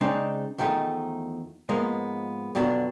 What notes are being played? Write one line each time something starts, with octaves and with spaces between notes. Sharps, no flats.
C#3 G#3 C4 D4 D#4
E2 D#3 F3 A3 D#4
G#2 F3 G#3 A#3 B3
F2 B2 D3 F#3 B3 D4